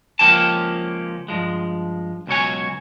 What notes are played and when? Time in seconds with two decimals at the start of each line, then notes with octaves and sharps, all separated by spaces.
0.19 C#2 F3 A#3 C#4 G4 A5
1.28 G2 F3 G#3
2.27 C#2 B2 F#3 C#5 G#5